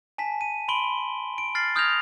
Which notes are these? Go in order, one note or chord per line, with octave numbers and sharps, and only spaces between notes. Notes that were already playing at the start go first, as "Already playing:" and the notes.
G#5 A5 B6
D#7
B5 C6 D7 F#7 G7
D7
F6 A6 C7 F#7
D#6 F6 G6 G#6 A#6 F7